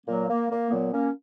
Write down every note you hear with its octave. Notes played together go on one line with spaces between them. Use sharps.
A#2 F#3 A#3
A#3
A#3
A#2 F#3 B3
A#3 C#4